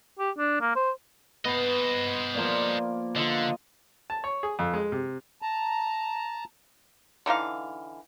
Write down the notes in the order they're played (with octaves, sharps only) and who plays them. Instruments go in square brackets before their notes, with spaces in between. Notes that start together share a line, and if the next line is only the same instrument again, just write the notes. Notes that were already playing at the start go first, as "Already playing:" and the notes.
[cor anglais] G4
D4
A#3
C5
[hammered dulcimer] B3 [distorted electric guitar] C5 D#5
[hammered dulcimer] F3 A#3 D5
[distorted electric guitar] D3 [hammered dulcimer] F4 D#5
[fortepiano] A5
C#5
G#4
F2
G#3
C3
[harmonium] A5 A#5
[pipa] D3 E3 D#4 F5